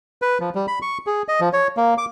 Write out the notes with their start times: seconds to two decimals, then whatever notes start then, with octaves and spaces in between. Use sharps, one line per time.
0.22 B4
0.40 F3
0.55 G3
0.68 B5
0.82 C#6
1.07 G#4
1.28 D#5
1.41 F3
1.53 C#5
1.77 A#3
1.98 D6